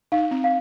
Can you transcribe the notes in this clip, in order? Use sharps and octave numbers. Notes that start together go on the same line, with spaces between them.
D#4 F5
C4
F5